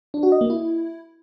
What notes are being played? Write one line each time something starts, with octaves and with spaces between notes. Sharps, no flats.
D4
F#4
D#5
A#3
E4